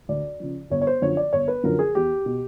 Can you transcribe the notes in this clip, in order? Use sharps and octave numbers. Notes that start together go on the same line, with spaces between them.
D2 D5
C#3 F3
G1 C#5
C#5
C5
F#2 D3 F3 C#5
D5
G1 C#5
B4
F#2 D3 F3 A#4
G#4
E2 G4
B2